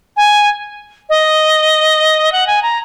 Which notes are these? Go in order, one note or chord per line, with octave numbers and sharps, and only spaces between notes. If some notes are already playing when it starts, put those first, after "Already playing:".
G#5
D#5
F#5
G#5
A#5